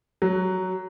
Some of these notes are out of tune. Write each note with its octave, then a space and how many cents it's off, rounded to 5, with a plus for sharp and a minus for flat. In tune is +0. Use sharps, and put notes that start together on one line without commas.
F#3 +10